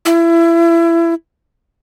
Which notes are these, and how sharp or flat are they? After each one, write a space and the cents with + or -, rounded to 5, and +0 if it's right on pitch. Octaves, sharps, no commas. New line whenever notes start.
E4 +25